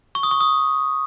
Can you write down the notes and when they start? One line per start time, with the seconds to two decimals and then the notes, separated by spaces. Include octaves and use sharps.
0.15 C#6
0.23 D#6
0.31 C#6
0.40 D#6